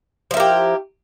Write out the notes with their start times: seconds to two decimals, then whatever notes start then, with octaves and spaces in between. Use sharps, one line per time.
0.31 F3
0.34 E4
0.37 A#4
0.40 G4